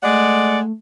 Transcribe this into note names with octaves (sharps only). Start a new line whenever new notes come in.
G#3 A3 D5 F#5